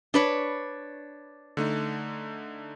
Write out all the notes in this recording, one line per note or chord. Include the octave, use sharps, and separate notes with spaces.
D4 B4 C#5
D3 A3 D#4